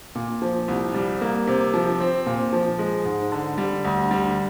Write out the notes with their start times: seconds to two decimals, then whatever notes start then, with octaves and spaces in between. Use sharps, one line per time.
0.15 A#2
0.42 F3
0.68 C2
0.94 G3
1.21 A#3
1.47 C3
1.74 F3
2.00 C4
2.26 A#2
2.53 F3
2.79 G#3
3.05 G#2
3.32 D3
3.58 G3
3.84 D2
4.11 G3